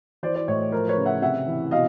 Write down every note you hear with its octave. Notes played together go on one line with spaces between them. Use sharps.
E3 C5 D5
C5 D5
A2 C#5 D#5
F3 A#4 C5
B4 C#5
C#3
E5 F#5
C3 E5 F#5
E3
B2 D#5 F5